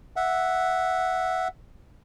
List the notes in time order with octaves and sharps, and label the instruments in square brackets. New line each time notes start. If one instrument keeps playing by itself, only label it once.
[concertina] E5 F#5